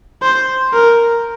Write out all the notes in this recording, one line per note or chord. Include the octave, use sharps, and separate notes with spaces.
C5
A#4